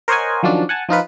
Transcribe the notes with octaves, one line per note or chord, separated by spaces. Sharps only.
A#4 C5 C#5 D#5 F#5 G#5
D#3 F3 F#3 C#4 D4
F#5 G#5 A5
F3 D#4 F4 B4